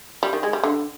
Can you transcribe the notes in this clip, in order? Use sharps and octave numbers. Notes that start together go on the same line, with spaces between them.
G3
D#3
G#3
G3
D3